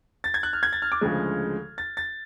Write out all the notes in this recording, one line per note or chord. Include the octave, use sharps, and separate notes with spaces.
A6
G#6
F#6
F6
G#6
A6
F6
D6
D2 C#3 F3 G#3
A6
A6